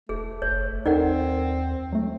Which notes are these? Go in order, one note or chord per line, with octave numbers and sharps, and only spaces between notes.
E1 A3 G#4
F#1 C#5
D#2 C4 D#4 A4 A#4 D5 F#5
F#3 A3